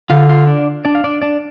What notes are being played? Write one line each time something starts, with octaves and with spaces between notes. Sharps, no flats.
D3 F4 F5
F4 F5
D4 D5
D4 D5
F5
D4 D5
D4 D5